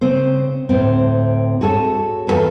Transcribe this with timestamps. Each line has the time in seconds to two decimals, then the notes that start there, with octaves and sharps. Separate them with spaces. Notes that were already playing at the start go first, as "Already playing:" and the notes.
0.01 C#3 C4 C5
0.69 D2 A2 C4
1.61 F#4 G#4 A4 C#5
2.27 E2 B3 F4 A4 G#5